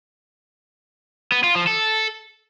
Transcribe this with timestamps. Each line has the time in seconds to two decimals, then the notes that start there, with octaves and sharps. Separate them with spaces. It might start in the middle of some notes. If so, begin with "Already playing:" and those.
1.32 B3
1.44 F4
1.55 F3
1.67 A4